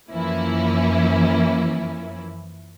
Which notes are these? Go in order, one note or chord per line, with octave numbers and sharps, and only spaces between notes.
F#2 E3 F3 A#3 C#4 E4